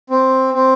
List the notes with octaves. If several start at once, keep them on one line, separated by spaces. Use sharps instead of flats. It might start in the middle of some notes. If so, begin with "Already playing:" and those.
C4
C4